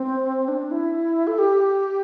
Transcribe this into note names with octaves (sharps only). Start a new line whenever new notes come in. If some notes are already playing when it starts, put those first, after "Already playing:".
Already playing: C4
D4
E4
A4
G4